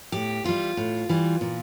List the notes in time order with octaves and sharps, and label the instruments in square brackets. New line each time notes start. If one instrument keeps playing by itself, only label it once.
[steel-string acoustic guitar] A2 G4
E3 G3 F4
A2
E3 G3
A#2